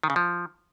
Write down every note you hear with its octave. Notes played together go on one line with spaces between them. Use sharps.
D#3
C#3
F3